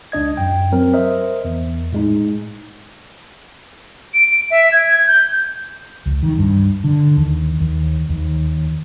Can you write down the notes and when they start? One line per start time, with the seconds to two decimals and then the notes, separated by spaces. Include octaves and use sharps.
0.12 C#2 D4 D#5 G#6
0.37 F#2 G5
0.72 F#3 C4 A#4
0.93 A#4 C5 D#5 E5
1.45 E2
1.93 A2 G#3 D#4
4.14 D7
4.51 E5
4.72 G#6
5.07 G6
6.06 C#2
6.23 D#3
6.37 G2
6.84 D3
7.17 D#2
7.60 D#2
8.09 D#2